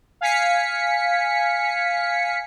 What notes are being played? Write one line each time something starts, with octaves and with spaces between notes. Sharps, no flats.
F5 G#5 B6 C#7